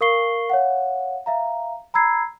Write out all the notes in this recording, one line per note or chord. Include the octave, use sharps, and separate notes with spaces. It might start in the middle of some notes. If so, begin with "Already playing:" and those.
A#4 F5 C#6 C7 G7
C#5 F5 F#5
E5 F5 A#5
A#5 B5 E6 G#6 C7